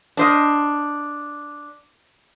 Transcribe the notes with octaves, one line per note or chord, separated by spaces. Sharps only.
D4 C5 D#5